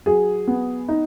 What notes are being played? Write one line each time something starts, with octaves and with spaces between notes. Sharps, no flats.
F#3 G#4
B3
D#4